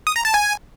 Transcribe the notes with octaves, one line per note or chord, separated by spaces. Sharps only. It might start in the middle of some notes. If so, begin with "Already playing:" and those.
D#6
A#5
A5
G#5